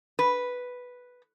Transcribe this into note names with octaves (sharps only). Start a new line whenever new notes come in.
B4